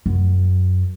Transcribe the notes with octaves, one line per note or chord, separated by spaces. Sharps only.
F#2